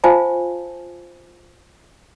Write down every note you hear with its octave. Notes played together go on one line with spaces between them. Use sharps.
F4 C5 F5 G#5 A5